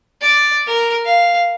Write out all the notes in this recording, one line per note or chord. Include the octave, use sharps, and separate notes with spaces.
D5
A#4
F5